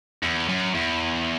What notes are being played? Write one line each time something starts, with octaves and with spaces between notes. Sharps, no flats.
E2
F#2
E2